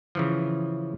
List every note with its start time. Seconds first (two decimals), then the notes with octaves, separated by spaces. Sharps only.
0.15 C#3 E3 F3